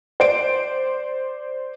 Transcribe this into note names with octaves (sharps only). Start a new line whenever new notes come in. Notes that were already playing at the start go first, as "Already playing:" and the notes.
C5 D5 D7